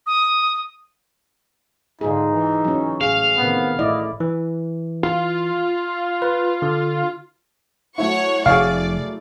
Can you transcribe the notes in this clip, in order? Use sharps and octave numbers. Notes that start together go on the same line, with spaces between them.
D#6
G#2 D3 D#4 F4 G#4
E3
F#3 C#4
A1 G#4 F5
C3 D#3 B3
A1 A3 E4 D5 D#5
E3
F4
B4
D3
F#3 A3 E4 C#5 F#5 C#6
F1 C3 G#4 C#5 D5 F5